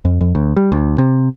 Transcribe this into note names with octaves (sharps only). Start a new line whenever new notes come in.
F2
F2
D2
G3
D2
C3